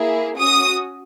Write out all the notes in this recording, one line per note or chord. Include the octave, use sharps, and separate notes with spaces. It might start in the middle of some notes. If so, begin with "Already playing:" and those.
Already playing: A#3 E4 G#4
C#4 F#4 D#6